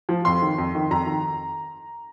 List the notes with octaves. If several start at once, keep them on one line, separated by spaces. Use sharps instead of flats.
F3
F2 C6
D#3
F2
D#3
F2 A#5
D#3